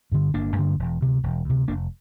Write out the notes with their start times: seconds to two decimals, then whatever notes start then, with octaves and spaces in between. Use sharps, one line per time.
0.12 G2 D3
0.34 G1 A#3 D4
0.56 G2 D3
0.79 E1
1.01 D2 C3
1.23 E1
1.45 D2 C3
1.68 F1 A#3 D4